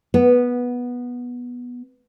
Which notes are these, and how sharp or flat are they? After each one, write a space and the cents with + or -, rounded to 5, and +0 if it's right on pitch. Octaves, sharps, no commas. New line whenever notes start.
B3 -10